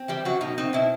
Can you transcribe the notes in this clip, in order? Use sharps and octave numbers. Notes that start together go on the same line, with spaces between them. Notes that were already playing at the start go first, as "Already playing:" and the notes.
Already playing: C4
E3 G3 G4
F#2 F#3 F#4
B2 D#4
C4 D#4
B2 E4